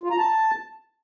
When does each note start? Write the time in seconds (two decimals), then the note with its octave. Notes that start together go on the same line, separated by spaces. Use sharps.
0.03 F4
0.11 A#5
0.18 A5